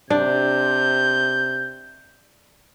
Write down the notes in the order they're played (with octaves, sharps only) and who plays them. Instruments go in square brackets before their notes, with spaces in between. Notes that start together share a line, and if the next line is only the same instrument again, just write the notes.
[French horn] C3 [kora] D4 [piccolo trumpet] G6